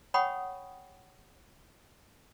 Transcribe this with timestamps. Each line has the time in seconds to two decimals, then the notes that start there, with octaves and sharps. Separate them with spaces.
0.14 C#5 F#5 G5 B5 C#6 D#6